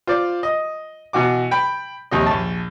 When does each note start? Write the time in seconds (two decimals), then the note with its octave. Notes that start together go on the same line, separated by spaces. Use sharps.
0.07 F4 C5 D5
0.43 D#5
1.13 B2 E3 F#4 D6
1.51 G5 B5
2.11 A#1 D#2 C3 D#5
2.26 A#1 A5